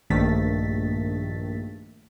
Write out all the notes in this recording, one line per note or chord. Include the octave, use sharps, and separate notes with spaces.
A#1 G2 D#3 A3 A6 B6